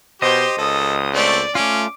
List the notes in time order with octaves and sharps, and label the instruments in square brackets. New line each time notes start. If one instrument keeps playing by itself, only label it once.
[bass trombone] B2 [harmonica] G4 [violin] C5 C6 [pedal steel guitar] D#5
[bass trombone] C#2 [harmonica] A4 [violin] D#6
[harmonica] A3 C4 [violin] D5
[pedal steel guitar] A3 F4 [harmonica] C#4 [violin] D6